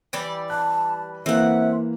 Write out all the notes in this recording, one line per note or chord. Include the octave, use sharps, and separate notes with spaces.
E3 G3 D5
A5 F#6
E3 A#3 C4 E5 F#5